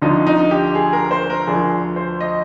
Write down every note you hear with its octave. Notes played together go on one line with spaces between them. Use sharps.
D2 D3 F3 D#4
D#4
G4
G#4
A#4
C5
A#4
D2 D3 F3 G#4
C5
D#5